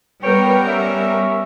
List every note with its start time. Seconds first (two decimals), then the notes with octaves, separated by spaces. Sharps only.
0.22 G3 B3 A#4 B4 C#5 G5
0.66 C#4 E5